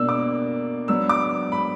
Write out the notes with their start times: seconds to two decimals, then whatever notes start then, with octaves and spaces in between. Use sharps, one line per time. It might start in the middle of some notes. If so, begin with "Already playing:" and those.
Already playing: B2 A#3 D4 E6
0.09 D6
0.88 F#3 B3 D4 E6
1.09 D6
1.52 B5